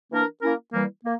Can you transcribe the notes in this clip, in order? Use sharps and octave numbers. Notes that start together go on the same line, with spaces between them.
E3 A#3 D4 A#4
A#3 C#4 E4 A#4
E3 G3 A#3
A#3